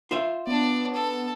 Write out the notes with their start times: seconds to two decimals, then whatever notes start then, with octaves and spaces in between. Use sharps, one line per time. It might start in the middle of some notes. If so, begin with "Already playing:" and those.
0.11 F4 C5 E5
0.47 B3 D4 D5
0.94 A4